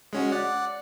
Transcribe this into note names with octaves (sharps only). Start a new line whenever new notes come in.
G#3 C#4 F#4
D5 F#5